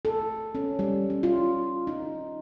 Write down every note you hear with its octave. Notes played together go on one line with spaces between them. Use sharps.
A4
C#4
G3
C#4
F4
D#4